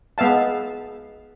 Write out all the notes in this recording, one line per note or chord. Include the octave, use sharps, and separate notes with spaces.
G#3 B3 E5 F5 A5